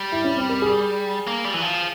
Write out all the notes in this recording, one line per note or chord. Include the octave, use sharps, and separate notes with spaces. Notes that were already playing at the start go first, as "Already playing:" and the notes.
Already playing: G3
E4
C#4
C4
A#4
G#4
A#3
G3
E3
F3